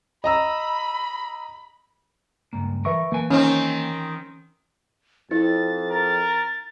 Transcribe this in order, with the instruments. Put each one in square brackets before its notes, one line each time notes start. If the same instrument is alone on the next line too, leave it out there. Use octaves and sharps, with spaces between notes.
[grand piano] D#5 A#5 E6 [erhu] B5
[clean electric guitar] C#2 G2 A#3
[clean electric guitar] E3 A#4 [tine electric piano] B4 E5 C#6
[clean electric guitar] E3 G#5 [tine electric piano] A#3
[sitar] D#3 C4 [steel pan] C#4
[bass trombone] F2 [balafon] E4 [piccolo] A6
[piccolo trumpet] A#4